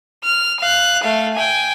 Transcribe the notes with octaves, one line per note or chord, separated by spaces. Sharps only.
F6
F5 F#6
A3 F5
G5 G#5